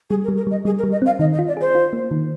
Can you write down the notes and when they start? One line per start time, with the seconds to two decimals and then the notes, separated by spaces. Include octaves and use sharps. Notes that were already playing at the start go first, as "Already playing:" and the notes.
0.10 G3 G#4
0.24 A#4
0.28 G3
0.37 A#4
0.47 G3 D#5
0.65 G3 G#4
0.79 A#4
0.83 G3
0.92 D#5
1.02 C4 F5
1.19 D#3 D#5
1.33 D#5
1.39 F4
1.48 D5
1.57 G#4 C5
1.75 F4
1.93 A#3
2.11 D#3